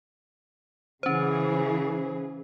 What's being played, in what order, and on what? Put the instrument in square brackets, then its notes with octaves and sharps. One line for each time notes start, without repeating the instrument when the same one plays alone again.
[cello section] C#3 E3 G#4 [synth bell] C#4 C5